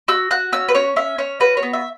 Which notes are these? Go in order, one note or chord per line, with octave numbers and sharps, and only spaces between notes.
F#4 E6
F#4 F#6
C#4 E6
B4
C#4 C#5
C#4 E5
C#4 C#5
F#4 B4
C#5
B3
E5